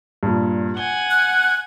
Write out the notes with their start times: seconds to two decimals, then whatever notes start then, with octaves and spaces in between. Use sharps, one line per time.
0.23 G2 A#2
0.77 F#5 G#5 G7
1.11 F#6